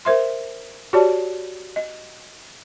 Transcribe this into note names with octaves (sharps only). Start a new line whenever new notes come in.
A#4 C5 E5 C6
F#4 G4 C#5 D5 A5
D#5